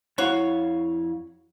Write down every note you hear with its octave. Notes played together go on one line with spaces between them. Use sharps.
F2 E4 F#4 C#5 F5